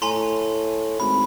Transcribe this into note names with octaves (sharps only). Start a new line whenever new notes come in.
A2 G#5 A#5 C6
G#1 B5